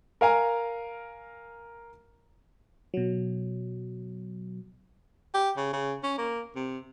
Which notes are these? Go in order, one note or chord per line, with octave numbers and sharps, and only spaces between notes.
A#4 F5 G#5 A#5
B2 F#3
G4
C#3
C#3
C#4
A#3
C3